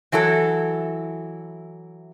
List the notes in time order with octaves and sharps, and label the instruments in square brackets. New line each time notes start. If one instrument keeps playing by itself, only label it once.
[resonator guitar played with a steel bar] E3 F#3 E4 A4